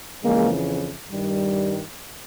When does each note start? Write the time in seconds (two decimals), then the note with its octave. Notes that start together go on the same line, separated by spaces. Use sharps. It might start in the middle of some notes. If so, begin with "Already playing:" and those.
0.22 F2 C#3 E3 G#3 A#3
1.10 G2 D#3 G3